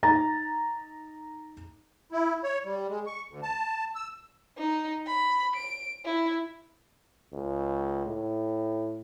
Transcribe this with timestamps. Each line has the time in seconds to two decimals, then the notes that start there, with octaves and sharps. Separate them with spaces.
0.03 D#4 A#5 A6
2.12 E4
2.44 C#5
2.65 G3
2.88 G#3
3.07 C#6
3.29 D2
3.43 A5
3.95 E6
4.58 D#4
5.07 B5
5.56 D7
6.05 E4
7.33 C#2
8.06 A2